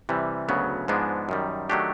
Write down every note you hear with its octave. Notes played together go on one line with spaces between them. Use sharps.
C3 E3 G3
D2 C#3 F#3 B3
G#2 F3 G#3 B3 D4
F#2 D#3 G3
D#3 F#3 A3 D4 G4